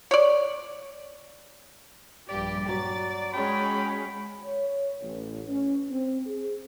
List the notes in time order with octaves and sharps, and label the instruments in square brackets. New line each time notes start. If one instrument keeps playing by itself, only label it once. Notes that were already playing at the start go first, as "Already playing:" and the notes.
[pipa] C#5 D5
[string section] A#1 G2 G4 [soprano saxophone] D5
[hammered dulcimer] F#3 [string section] A6
[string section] G#3 C#4 [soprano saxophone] G5 [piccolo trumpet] B5
[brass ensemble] C#5
A1
C#4
C4
G#4